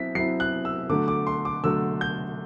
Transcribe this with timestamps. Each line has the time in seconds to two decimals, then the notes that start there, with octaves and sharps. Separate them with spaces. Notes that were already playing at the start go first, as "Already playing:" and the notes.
Already playing: F#3 C4 E4 B6
0.15 F#3 C4 E4 C7
0.40 F#6
0.65 E6
0.89 D3 F#3 A3 D6
1.08 D6
1.27 C6
1.45 D6
1.64 D3 F#3 A3 E6
2.01 G6